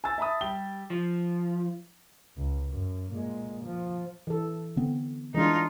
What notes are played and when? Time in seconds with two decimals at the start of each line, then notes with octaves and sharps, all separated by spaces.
0.04 G#5 E6 A6
0.18 E5 A5 B5 D#6
0.41 G3 G4 G7
0.90 F3
2.37 C#2
2.69 F#2
3.12 A#2 G#3
3.65 F3
4.27 E3 A4
4.76 D3 B3 C4
5.34 E3 G#3 D4 D#4 F4